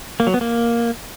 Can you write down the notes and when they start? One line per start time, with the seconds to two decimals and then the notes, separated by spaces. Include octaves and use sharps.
0.20 A#3
0.27 F#3
0.34 B3
0.41 A#3